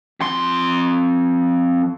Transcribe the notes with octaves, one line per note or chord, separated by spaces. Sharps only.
F2 C6